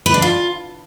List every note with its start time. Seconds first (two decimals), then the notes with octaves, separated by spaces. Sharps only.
0.06 B4
0.14 D4
0.22 F4